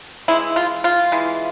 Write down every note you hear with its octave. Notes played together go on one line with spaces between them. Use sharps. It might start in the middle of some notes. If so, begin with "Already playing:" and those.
E3 G#3 E4
F4
F4
E3 G#3